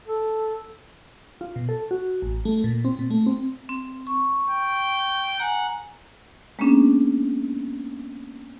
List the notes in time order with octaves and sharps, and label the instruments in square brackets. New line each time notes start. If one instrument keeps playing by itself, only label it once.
[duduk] A4
[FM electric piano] F4
B2
A4
F#4
A1
A3
A#2
C4
A#2
A3
C4
[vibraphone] C4
C#6
[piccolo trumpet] G5
[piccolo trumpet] F#5 [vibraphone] G#5 A#5
[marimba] G#3 A#3 B3 C#4 D4 G#4